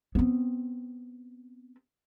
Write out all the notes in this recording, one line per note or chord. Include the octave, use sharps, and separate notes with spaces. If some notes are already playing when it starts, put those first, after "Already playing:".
B3 C4